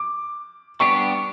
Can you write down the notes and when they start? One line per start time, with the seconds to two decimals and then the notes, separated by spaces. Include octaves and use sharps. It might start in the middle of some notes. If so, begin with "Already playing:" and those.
Already playing: D6
0.80 G3 B3 D4 G4 C#6